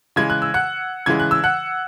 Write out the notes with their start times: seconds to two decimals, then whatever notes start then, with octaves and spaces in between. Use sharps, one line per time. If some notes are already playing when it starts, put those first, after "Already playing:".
0.16 C#3 E3 G#3 G#6
0.30 F#6
0.42 E6
0.54 F#5 F#6
1.06 C#3 E3 G#3 G#6
1.20 F#6
1.31 E6
1.44 F#5 F#6